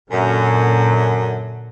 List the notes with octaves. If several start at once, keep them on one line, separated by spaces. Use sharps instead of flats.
F#2 A#2 D3